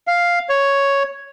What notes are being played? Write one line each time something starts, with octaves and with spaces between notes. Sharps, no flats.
F5
C#5